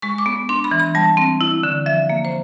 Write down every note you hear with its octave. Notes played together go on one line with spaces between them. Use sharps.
G#3 C#6
D6
B3
D4 C6
B5
E3
B5
G3 A5
C4
E4
D3
F3 E5
A#3
C5